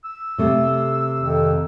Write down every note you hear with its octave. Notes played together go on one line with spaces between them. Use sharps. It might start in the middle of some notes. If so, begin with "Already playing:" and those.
E6
C3 A3
F2 D#3